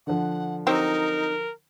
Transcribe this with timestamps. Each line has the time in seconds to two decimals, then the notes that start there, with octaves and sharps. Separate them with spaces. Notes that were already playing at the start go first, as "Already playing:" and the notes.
0.07 D3 F3 F#5
0.67 F#3 C4 D#4 G4 A#4